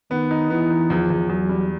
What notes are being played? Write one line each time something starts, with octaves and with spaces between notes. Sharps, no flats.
D#3 B3
D#4
E3 B3
D#4
E2 F3
E2
E2 F#3
G3